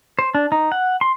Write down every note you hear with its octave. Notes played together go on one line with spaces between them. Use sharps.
C5
D4
D#4
F#5
C6